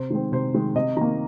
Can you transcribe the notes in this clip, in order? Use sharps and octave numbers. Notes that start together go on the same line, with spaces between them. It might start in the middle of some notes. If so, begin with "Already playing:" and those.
Already playing: C3 C5
D#3 G#3 C4
C3 C5
D#3 G#3 C4
C3 D#5
D#3 A#3 A#5